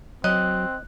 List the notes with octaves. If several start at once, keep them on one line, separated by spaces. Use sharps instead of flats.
F#3 C4 D#5 F#6